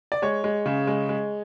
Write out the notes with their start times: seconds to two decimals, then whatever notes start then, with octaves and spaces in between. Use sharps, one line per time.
0.12 D5
0.22 G#3 C#5
0.44 G#3
0.66 C#3
0.87 G#3
1.09 G#3